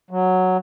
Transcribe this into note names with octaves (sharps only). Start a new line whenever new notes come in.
F#3